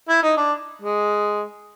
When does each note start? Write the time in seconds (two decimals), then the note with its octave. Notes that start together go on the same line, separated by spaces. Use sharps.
0.09 E4
0.22 D#4
0.37 D4
0.82 G#3